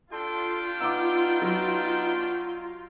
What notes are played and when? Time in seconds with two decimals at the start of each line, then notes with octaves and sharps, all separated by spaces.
0.12 G3 D4 F4 A4 G5 C6
0.81 B3 D#4 D6 E6
1.42 F#3